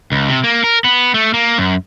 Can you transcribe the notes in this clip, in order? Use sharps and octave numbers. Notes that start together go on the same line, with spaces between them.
C#2
C3
A#3
A#4
B3
A3
A#3
F#2